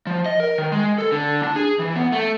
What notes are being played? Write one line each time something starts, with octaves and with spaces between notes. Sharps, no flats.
F3
D#5
A#4
D#3
G#3
A4
D3
D4
G#4
E3
B3
A3